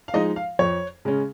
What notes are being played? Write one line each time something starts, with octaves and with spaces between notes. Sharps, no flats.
F5
F3 G#3 D#4 D#5
F5
F2 C#5
C#3 G#3 C#4